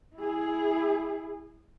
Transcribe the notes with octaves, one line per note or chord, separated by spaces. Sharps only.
E4 G#4